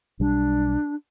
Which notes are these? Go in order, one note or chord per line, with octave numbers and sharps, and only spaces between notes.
B1 G3 D4